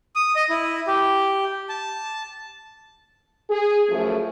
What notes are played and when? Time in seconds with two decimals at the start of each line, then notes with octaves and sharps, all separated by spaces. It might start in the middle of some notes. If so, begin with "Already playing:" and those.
0.15 D#6
0.36 D#5
0.50 E4
0.87 G4
1.69 A5
3.49 G#4
3.88 F#2 F3 A3